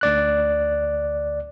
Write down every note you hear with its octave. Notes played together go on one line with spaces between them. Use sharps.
D2 D5 F#6